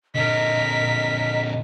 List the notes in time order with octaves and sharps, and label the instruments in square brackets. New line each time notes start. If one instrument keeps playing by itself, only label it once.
[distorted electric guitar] A#2 D3 [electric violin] A#4 B6 [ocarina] D#5